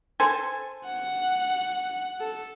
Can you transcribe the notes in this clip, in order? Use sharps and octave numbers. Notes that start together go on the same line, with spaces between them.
A4 C5 G#5
F#5
A4